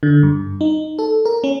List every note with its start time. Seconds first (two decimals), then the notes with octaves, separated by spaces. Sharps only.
0.03 D3
0.23 G2
0.61 D#4
0.99 A4
1.25 A#4
1.44 C#4